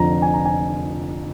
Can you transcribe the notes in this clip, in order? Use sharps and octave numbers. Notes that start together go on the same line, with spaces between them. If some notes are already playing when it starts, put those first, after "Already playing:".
Already playing: F1 F2 D3 F3 A#5
G#5
A#5
G#5